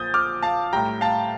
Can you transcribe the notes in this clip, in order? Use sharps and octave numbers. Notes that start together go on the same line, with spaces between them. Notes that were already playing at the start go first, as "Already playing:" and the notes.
Already playing: A#2 F3 D#6 G6 A6
D6 F6
F5 A5
A2 G3 G5 A#5
F5 A5